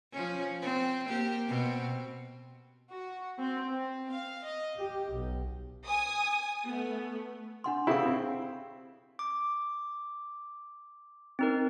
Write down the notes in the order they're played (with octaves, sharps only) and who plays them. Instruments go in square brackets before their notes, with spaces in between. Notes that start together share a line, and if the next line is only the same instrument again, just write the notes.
[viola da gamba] F3 C#4
C4
A#3 G4
B2 C4
[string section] F#4
C4
C4
F5
D#5
G4
B1
G#5 D#6
A3 B3
[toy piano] D4 F#5 C6
[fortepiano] C#3 C4 E4 [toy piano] G4 A4 F5
[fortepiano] C4
[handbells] D6
C4 D#4 A#4